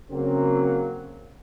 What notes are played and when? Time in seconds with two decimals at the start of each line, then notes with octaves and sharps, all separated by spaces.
0.11 C#3 F#3 A#3 C4